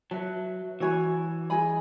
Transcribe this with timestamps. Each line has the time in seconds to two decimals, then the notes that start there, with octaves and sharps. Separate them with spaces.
0.11 F#3 B4 E5 A5
0.80 E3 F#4 C#5 G#5 B5
1.50 G#4 D#5 G#5 B5